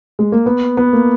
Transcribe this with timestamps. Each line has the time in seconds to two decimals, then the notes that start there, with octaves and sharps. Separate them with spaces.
0.19 G#3
0.32 A#3
0.46 B3
0.77 B3
0.93 A#3